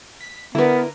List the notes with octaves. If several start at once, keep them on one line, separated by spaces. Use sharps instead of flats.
B6
D3 B3 E4 A#4 B4